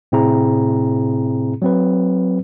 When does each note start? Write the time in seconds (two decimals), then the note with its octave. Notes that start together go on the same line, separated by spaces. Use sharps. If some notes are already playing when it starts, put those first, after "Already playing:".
0.12 A2 C3 C4 E4 G#4 A#5
1.62 F#3 C4 B4